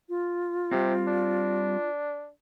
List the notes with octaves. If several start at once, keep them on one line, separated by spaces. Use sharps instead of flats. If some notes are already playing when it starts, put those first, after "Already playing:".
F4
C3 G3 C4
D4